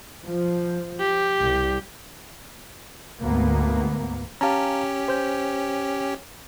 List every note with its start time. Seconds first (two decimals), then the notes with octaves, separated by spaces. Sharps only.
0.25 F3
1.00 G4
1.39 C2
3.22 D2 G#2 A#3 B3
4.41 C#4 G4 F5 A5 A#5
5.08 C5 G6